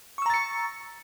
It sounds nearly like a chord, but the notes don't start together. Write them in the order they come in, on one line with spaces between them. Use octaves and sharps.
C#6 E6 A#5 A6 C#7